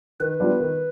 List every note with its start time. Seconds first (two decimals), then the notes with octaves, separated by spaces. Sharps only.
0.20 D#3 B4
0.40 G3 B3 D4 F4
0.60 D#3